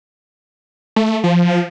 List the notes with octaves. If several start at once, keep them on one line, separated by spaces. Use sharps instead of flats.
A3
F3
F3